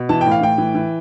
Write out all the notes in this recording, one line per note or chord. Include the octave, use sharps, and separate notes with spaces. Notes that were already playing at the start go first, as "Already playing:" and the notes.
Already playing: B2
E3 A5
A2 G5
F5
A2 G5
E3
E3